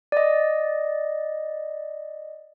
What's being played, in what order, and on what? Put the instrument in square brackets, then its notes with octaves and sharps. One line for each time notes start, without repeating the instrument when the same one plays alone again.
[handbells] D5 D#5